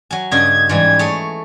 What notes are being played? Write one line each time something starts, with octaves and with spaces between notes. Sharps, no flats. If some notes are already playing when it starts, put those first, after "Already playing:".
F#3 G#5
G2 C#3 D#5 G#6
G#2 E3 G3
A3 G#4 C#5